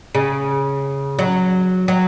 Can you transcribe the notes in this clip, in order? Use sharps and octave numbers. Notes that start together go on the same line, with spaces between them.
C#3
F#3
F#3